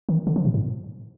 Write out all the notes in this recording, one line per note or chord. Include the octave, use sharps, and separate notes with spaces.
D#3
D3
F3
A#2
G#2